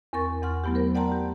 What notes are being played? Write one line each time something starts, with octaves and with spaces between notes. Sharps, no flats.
E2 C4 A#4 C#6 A6
E2 F#5 C6 F6
F#3 A3 B3 E4 G4
A#4 C5
D5 F#5 G5 A5 A#5 C6
G4